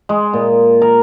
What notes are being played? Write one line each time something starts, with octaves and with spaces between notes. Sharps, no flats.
G#3
A#2
A#4